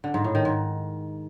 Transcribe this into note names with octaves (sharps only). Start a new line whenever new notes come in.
D3
G#2
A2
D#3
G#2